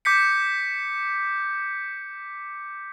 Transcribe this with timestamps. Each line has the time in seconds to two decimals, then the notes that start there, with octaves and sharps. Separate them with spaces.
0.05 D6 G6 B6 C#7